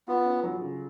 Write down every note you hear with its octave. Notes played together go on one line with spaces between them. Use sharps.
B3 F4
C#4
F#3
C#3